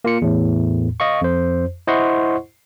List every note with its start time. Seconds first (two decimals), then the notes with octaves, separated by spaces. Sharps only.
0.05 A#3 F4 C#7
0.22 E2 A2
1.00 D#5 F5 C#6
1.21 F2 C5
1.87 E4 C5 D#5 F#5 C6 C#6